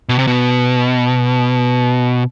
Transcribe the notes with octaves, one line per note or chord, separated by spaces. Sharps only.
B2
C3
B2